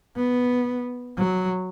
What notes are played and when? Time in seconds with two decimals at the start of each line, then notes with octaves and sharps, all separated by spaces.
0.16 B3
1.18 F#3